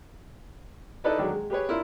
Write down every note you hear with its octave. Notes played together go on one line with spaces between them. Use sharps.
D#4 E4 A4 B4 D5 D#5
D3 D#3 F#3 G#3
G#3
G4 G#4 B4 C#5
D4 E4 F4 A#4 C6